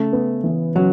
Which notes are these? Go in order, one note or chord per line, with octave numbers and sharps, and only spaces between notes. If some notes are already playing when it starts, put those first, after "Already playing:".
Already playing: C#3 A3
B3
E3
C#3 F#3